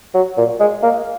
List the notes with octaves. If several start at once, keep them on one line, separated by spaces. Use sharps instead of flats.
F#3
A#2
G#3
A#3